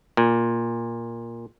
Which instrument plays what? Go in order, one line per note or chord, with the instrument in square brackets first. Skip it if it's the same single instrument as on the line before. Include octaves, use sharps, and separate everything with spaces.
[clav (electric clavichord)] A#2